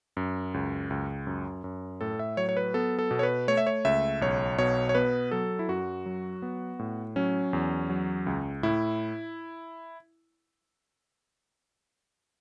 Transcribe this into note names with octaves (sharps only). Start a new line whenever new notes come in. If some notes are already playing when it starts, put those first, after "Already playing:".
F#2
C#2
C#2
F#2
F#2
A2 A4
E5
F#3 C#5
C#5
B4
B3 A4
A4
B2
C#5
B4
A3 C#5
E5
C#5
C#2 E5
B1 C#5
B2 C#5
C#5
B3 B4
F#3 A4
E4
F#2 F#4
F#3
B3
A2
F#3 C#4
E2
F#3
C#2
A2 E4